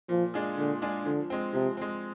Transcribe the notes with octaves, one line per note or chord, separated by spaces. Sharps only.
A#2 F3
G#3 D4 F4 G#4
A#2 D3
G#3 D4 F4 G#4
D3 F3
G#3 C4
C3 F3
G#3 C4